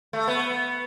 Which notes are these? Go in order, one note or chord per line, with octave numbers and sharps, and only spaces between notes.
A3
B3